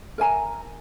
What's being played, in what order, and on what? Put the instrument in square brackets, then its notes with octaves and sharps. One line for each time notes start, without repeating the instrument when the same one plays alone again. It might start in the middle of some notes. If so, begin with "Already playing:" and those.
[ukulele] A#4 E5 G#5 A#5